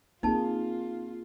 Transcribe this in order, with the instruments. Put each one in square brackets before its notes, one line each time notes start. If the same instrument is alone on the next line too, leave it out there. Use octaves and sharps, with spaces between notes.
[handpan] A#3 G#4 [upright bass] C4 [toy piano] D#4 A5 [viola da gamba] F4